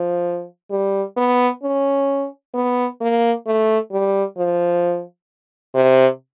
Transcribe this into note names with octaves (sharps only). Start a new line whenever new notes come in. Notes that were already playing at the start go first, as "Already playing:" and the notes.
Already playing: F3
G3
B3
C#4
B3
A#3
A3
G3
F3
C3